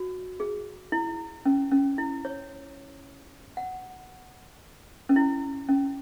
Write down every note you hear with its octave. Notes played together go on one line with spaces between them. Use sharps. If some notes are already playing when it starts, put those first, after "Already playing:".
Already playing: F#4
G#4
E4
C#4
C#4
E4
C#5
F#5
C#4
E4
C#4